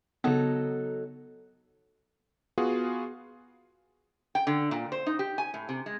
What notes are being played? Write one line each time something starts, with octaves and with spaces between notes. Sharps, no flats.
C#3 F#3 B3 D#4 A4
B3 F4 F#4 G#4
G5
D3
A#2
C5
D#4
G4
G#5
A2
C3
G#3